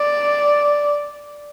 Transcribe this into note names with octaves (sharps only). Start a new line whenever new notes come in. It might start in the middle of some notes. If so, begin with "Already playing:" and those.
Already playing: D5